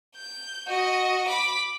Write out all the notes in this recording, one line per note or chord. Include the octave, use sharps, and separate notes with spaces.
G6
F#4 D#5
B5 D6